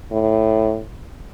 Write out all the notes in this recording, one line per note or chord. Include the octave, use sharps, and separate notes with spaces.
A2